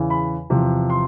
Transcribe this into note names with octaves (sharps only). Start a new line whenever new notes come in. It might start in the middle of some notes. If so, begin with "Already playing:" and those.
Already playing: E2 C#3 E3
B5
E2 C3 F3
C6